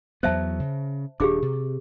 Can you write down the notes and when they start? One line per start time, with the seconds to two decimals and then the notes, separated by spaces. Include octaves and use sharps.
0.23 E2 F#3 B3 C5 E5 A5
0.60 C#3
1.20 D#1 D4 G4 G#4 D6
1.42 C3